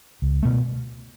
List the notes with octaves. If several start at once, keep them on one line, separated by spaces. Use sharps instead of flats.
C#2
B2 A3